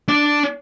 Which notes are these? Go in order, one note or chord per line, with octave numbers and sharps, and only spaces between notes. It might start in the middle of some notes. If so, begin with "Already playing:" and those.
D4